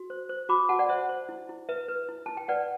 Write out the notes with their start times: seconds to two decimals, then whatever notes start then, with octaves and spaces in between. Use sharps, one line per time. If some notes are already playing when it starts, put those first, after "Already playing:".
Already playing: F#4
0.10 C5
0.29 C5
0.49 F#4 B5 D6
0.69 F#4 F#5 A5
0.79 D5 F#5
0.89 C5 E5
1.09 C5
1.29 E4
1.49 E4
1.69 B4 E5
1.88 B4
2.09 E4
2.26 E4 A5
2.37 G5
2.48 B4 D5 F#5